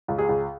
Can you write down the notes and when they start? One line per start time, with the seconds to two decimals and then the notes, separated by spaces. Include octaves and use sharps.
0.08 C#2
0.18 G#4
0.29 C#2